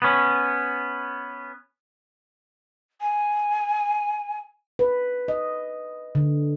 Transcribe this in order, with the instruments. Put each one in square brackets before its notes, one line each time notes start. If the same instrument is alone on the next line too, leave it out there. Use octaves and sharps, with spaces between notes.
[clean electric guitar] B3 C#4
[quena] G#5
[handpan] B4
D#5
D3